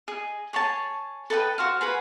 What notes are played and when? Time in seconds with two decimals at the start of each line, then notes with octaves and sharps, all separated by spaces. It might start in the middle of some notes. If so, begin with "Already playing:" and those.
0.08 G#4 D#5
0.53 G#4 C#5 G#5 A5
1.30 A4 B4 D#5 G5
1.58 F#4 C5 F5
1.81 G#4 B4 F#5